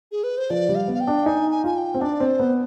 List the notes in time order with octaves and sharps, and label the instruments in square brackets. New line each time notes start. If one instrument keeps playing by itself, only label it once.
[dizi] G#4
B4
C5
[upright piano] F3 [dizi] D5
[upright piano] G3
[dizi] F5
[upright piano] B3
[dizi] F5
G5
[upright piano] D4
[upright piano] D#4 [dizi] G#5
[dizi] G#5
[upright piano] F4 [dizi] G#5
[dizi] G5
[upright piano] C4
[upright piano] D4 [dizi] D5
[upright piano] C4
[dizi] C5
[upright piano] B3